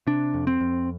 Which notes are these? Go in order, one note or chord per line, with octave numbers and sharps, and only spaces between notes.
C3 D4
F2
C4
F2